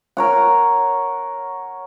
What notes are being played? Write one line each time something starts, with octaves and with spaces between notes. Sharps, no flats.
A#4 C#5 F#5